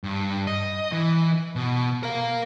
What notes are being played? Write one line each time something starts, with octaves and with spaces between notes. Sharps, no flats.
G2
D#5
E3
B2
A#4 F5